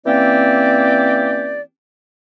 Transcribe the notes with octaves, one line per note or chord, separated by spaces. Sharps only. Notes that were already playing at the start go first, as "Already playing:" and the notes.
E3 A#3 C4 C#4 G4 D5